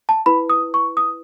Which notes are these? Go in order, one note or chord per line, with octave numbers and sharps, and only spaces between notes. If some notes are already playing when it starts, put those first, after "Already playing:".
A5
E4 B4 B5
D#6
C#6
D#6